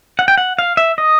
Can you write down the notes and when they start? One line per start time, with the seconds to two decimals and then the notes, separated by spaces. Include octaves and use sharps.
0.19 F#5
0.28 G5
0.38 F#5
0.59 F5
0.77 E5
0.98 D#5